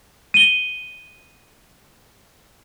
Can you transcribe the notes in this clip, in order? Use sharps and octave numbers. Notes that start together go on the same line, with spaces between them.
D#7 G7